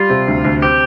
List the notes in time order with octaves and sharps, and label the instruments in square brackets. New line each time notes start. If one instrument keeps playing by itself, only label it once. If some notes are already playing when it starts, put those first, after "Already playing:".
Already playing: [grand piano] G3 [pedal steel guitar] F4
[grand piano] C3
D2
D2
[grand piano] C4 [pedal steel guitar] G4